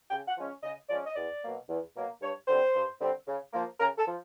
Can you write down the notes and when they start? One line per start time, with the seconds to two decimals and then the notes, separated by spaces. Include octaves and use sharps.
0.11 C#3 G5
0.28 F#5
0.37 F3 G#3 C#4
0.63 C#3 D#5
0.90 F3 G#3 C#4 D5
1.06 D#5
1.16 E2 D5
1.43 B2 F#3 A#3
1.69 E2
1.95 B2 F#3 A#3
2.22 G2 C#5
2.48 D3 G3 C4 C5
2.75 G2
3.00 D3 G3 C4
3.28 C#3
3.53 F3 A#3
3.80 C#3 A#4
3.98 A4
4.06 F3